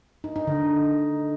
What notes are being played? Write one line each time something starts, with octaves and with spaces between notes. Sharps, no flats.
D#4
D#4
D3